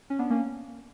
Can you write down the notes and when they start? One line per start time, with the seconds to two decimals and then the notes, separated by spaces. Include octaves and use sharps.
0.10 C#4
0.19 B3 D4
0.30 A#3 C#4